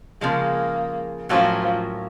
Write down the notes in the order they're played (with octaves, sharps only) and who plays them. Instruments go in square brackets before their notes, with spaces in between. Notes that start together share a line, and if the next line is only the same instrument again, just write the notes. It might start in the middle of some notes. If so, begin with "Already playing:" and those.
[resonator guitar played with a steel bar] C#3 F3 G#3 [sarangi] A#3
[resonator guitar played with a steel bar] A2 F#3 A#3 C#4 F4 [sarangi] F3